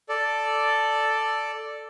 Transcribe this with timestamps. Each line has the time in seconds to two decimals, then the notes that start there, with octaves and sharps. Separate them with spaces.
0.09 A4 D5